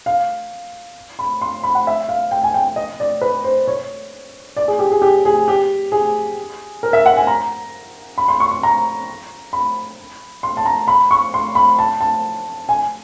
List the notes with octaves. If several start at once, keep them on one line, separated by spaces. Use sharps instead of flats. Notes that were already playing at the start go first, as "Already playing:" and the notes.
F5
B5
C6
B5
F#5
E5
F5
G5
G#5
G5
D#5
D5
B4
C5
C#5
D5
G#4
G4
G#4
G4
G#4
G4
G#4
A#4
E5
F#5
G#5
A#5
B5
C6
C#6
C6
A#5
B5
C6
A5
A#5
B5
C#6
C6
B5
A5
A5
G#5